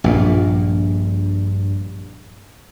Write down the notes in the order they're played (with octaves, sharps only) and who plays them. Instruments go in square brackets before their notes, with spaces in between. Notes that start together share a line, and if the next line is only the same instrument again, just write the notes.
[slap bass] A#1 A#2 [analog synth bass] G2